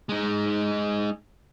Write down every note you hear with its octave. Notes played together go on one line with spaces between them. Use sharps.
G#3 D#4